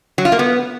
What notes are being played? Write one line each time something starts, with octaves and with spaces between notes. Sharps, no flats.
F#3
F4
A#3
B3